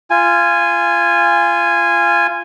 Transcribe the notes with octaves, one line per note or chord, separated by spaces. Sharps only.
F4 G#5